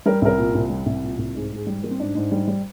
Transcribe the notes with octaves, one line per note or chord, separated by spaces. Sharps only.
G3 A#4
C2 A#4
A#2
C2
G3
C2
A#2
C2
G#2 G#4
G#2 G#4
G3
G3 A#3
C4
G#2 D4
G#2
G3
G3